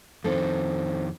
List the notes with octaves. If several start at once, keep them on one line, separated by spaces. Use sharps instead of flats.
F2 D#3 C4 A4